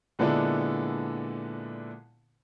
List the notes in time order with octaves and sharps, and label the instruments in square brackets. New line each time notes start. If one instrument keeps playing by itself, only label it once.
[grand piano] A#2 D3 G#3 B3 D4 E4